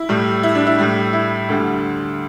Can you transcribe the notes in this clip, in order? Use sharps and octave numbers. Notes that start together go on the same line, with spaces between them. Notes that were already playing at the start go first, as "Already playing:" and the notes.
Already playing: E4
A2 G3
E4
D4
E4
A2 G3
E4
D2 D3 G3